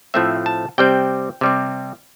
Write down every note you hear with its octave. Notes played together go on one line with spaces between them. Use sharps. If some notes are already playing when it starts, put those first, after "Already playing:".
A2 F3 A3 C4 E5
A5
C3 G3 C4 G5
C3 G3 C4